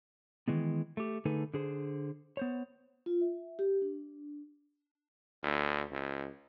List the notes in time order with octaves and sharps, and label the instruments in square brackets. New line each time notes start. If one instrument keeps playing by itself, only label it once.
[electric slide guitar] D#3 E3 G#3 B3
A3 G4
D3 A3 D#4 G#4 A4 B4
D3 G#4 C5
B3 C5 C#5
[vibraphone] F4
E5
G4
D4
[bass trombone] D2
C#2